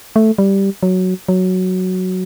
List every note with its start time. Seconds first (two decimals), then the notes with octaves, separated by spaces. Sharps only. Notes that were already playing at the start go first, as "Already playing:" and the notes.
0.16 A3
0.38 G3
0.83 F#3
1.29 F#3